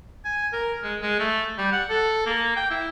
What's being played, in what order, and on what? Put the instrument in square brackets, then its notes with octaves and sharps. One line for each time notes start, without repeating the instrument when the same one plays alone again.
[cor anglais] G#5
A#4
G#3
G#3
A3
G3
F#5
A4
A#3
G5
E4